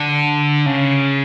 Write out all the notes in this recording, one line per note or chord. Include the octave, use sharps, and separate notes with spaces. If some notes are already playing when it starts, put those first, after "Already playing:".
Already playing: D3
C#3